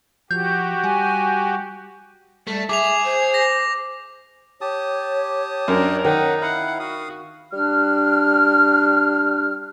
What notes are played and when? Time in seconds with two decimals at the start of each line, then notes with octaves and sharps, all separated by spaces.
0.31 F3 F#4 G4 G6
0.84 G3 G#5
2.47 G3 A3
2.69 G#4 E5 D6 F7
3.05 C5
3.34 A#6
4.61 G4 C#5 A5 D#6
5.68 F#2 D4 A#4
6.05 D#3 D#4 F#5
6.42 E4 F5 F#5
6.80 F#4 F5 D#6
7.52 G3 D4 F6